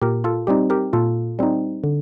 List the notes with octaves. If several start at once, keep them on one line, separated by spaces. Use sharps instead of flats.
A#2 G4 A#4
F4 A4
G3 C4 D#4 G4
G4 A#4
A#2 F4 A4
G3 C4 D#4
D3